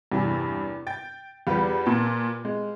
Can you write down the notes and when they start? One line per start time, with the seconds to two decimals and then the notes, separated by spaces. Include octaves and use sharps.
0.12 E2 G2 C3 E3
0.87 G5 A6
1.47 E2 G3 F4 G4 B4
1.86 A#2 A5
2.45 G#3